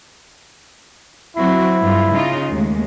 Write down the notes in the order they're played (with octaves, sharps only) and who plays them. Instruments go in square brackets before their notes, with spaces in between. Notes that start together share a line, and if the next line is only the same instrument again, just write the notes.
[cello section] F#3 C4 F#4 [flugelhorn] E4
[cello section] G2 F#3 F4
C#3 D#4 F4
D#2 G#3 A3